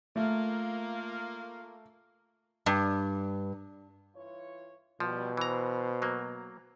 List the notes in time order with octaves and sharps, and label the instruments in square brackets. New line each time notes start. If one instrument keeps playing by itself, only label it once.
[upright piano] A3 [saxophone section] A#3 F4
[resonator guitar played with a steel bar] G2
[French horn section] E3 F4 C#5
[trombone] B2 [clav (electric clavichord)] F3 [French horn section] G3
[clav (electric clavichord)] E3 A#5 [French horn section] C5
[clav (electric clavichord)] F#3 A#3